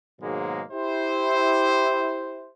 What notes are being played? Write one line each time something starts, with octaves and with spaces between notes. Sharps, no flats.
G#2 B2 D#3 F#3 G#3 A#3
E4 G4 C5